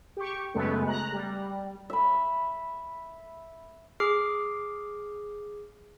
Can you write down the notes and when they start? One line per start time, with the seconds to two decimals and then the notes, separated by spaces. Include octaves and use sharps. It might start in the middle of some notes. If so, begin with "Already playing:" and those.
0.17 G4 C#6
0.54 F#2 C#3 G#3 A3 B3
0.87 A#5 F#6
1.12 G3
1.90 E5 B5
4.00 G#4 D6 F6 C7